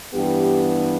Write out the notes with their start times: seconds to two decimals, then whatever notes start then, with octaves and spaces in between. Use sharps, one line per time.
0.13 G2 E3 B3 G4